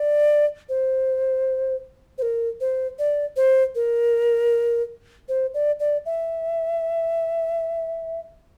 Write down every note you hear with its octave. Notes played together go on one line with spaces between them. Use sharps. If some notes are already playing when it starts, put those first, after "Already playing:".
Already playing: D5
C5
C5
A#4
C5
D5
C5
A#4
C5
D5
D5
E5